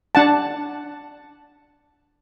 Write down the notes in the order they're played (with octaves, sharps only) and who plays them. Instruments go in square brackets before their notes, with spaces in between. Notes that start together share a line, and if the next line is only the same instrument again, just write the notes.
[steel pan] D4 F#5 A5